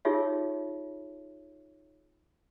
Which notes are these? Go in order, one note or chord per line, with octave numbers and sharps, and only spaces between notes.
D#4 F4 G4 G#4 C#5 E5